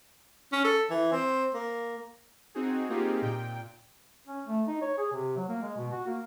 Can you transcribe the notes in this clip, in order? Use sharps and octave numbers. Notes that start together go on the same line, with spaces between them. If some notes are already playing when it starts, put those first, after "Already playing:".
C#4
A4
E3
C4
A#3
C4 D#4 F#4 G#4
A#3 C4 D#4 F4 G4 G#4
A#2 G5
C#4
A3
D#4
C#5
G#4
C3
F#3
A#3
G#3
B2
F#4
A#3